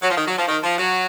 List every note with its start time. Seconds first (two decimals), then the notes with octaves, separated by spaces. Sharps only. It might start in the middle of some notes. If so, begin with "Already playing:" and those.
0.02 F#3
0.10 F3
0.18 D#3
0.27 F#3
0.38 F3
0.48 D#3
0.63 F3
0.78 F#3